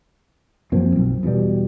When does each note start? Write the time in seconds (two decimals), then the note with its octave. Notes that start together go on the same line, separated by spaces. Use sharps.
0.72 F#2 F3 A#3 C4
0.96 B1
1.23 E2 B2 G3